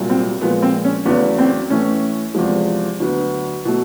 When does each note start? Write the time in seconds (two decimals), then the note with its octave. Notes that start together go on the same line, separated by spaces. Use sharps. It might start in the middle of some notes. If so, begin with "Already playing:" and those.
Already playing: C2 A#2 F#3
0.10 C4
0.41 A#2 F3 G#3 B3
0.62 C4
0.84 C#4
1.05 E2 C#3 F#3 A3 B3
1.38 C4
1.70 A2 E3 A3 C#4
2.34 E2 C3 F3 G#3
3.00 D2 D3 F#3 B3
3.65 B2 F#3 A3